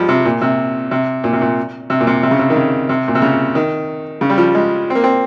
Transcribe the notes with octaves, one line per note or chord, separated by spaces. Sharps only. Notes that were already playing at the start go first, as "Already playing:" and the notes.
Already playing: F3 G3 G#3
C3
A#2
C3
C3
A#2
C3
A#2
C3
A#2
C3
C3
C#3
C3
D#3
C#3
C3
A#2
C3
C#3
D#3
C#3
G3
F3
G#3
C4
A#3
C4